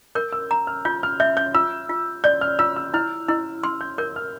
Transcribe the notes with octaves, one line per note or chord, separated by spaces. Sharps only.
A#4 G6
E6
A#5
F6
F4 G6
F6
E5 G6
G6
F4 E6
F4
D5 G6
F6
F4 E6
E6
E4 F6
E4 E6
C6 F6
G6
A#4 G6
F6